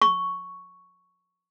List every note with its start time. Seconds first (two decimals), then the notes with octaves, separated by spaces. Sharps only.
0.02 C#6